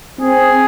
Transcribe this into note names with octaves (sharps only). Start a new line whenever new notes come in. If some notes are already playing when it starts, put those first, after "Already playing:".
C4 G#4